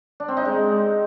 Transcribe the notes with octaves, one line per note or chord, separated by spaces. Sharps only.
D4
C4
D#4
G#3